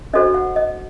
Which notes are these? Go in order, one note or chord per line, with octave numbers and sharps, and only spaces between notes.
D4 F#4 A4 C5 D#5
F#5
D#5